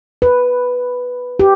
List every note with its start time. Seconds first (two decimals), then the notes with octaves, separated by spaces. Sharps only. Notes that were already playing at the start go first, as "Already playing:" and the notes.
0.22 B4
1.39 G4